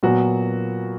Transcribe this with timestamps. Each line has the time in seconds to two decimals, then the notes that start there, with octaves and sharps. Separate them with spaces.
0.03 A#2 F#3 B3 F#4